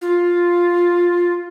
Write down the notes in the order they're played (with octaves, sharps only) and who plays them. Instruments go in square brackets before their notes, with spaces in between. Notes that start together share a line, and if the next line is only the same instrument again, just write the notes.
[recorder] F4